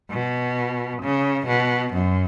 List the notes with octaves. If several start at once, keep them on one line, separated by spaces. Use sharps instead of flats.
B2
C#3
B2
F#2